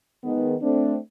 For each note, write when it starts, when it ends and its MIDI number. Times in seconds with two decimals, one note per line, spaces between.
0.23 0.55 51
0.23 0.55 56
0.23 0.55 59
0.62 0.97 57
0.62 0.97 60
0.62 0.97 62